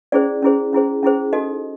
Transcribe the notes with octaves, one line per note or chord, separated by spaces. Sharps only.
C#4 E4 G#4 C5 D5
C#4 E4 G#4 C5
C#4 E4 G#4 C5
C#4 E4 G#4 C5
D#4 F#4 A4 D#5